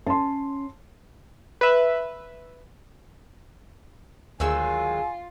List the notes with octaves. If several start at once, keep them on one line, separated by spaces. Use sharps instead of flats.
C#4 A5 C6
B4 E5
D2 D#3 F#3 G#3 F4 G#5 E6